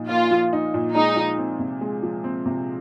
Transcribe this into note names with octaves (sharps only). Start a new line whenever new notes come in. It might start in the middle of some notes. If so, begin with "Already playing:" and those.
Already playing: A#2 F3 D#4
A#3 F4
F3
D#4
A#2
G#3 D#4
F3
C4
C3
G#3
F3
C4
C3